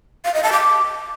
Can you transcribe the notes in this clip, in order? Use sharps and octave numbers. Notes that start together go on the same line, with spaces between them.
F5
D#5
A5
D6